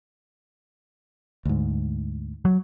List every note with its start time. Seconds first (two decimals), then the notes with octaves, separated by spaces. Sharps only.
1.45 D2 G#2
2.45 F#3